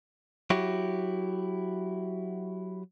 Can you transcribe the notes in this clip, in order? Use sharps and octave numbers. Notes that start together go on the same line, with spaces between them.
F#3 E4 F#4 G4